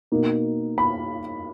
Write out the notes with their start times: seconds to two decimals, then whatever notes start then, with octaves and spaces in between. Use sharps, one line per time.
0.12 B2 A#3 D#4
0.78 B5